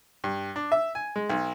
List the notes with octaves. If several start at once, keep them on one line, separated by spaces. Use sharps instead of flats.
G2
D4
E5
G#5
G#3
B1